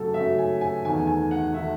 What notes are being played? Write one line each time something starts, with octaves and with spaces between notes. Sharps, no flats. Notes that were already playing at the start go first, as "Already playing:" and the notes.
Already playing: F#2 C#3 F#3 A3 A4
F#2 C#3 F#3 A3 E5
G#5
G#5
E2 D#3 A3 G#5
G#5
F#5
D#3 A3 E5